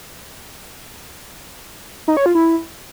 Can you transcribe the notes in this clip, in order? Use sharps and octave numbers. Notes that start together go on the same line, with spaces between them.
D#4
C#5
F4
E4